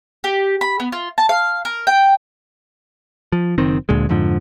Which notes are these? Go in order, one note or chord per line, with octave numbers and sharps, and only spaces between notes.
G4
B5
B3
F4
A5
F5
A#4
G5
F3
F#1 D#3 C4
D2 A#2 D3 G#3
F2 G#2 D3 F3